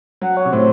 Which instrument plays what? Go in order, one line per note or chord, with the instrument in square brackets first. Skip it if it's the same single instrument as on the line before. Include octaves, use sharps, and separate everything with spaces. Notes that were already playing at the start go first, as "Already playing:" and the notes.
[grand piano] F#3 [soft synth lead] F#5
[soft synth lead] C#5
[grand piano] C3
[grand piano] A2 [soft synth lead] C5